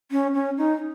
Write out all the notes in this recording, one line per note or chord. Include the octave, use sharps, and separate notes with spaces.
C#4
C#4
D#4